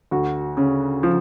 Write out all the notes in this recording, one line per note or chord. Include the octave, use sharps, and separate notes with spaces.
D2 F#4
C#3
F3